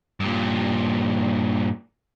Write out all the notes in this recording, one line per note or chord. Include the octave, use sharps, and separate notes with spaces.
G2 A#2